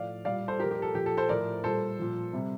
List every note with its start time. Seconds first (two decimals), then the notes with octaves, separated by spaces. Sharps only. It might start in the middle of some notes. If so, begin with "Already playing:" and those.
Already playing: A2 F3 D5 F5
0.25 A#2 G3 D5 F5
0.48 A4 C5
0.59 A#2 F3 G4 A#4
0.71 G4
0.82 A4
0.94 A#2 F3 G4
1.06 A4
1.17 A4 C5
1.29 A2 F3 A#4 D5
1.64 A#2 G3 A4 C5
1.99 A#2 F3
2.33 C3 G3